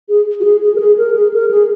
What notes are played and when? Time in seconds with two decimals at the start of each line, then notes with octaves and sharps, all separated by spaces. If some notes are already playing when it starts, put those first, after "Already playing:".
0.09 G#4
0.40 F#4
0.44 G#4
0.62 G#4
0.75 A#4
0.80 G#4
0.98 A#4
1.15 G#4
1.33 A#4
1.51 G#4